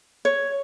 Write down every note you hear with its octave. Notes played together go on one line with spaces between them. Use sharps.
C#5